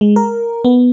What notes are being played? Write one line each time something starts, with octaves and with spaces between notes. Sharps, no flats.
G#3
A#4
B3